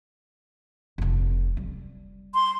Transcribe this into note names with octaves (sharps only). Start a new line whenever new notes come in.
F1 F2
G3
C6